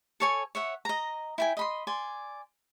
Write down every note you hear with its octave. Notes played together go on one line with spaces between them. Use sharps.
A4 C#5 G#5
C#5 E5 F#5
D#5 A#5
E4 G5 G#5
D#5 B5 C6
D5 G#5 C6